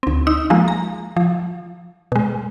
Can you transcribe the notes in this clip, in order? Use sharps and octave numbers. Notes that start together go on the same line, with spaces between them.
D2 C4
D#4 E6
F3 G#3 A#3
A#5
F3
B2 G#3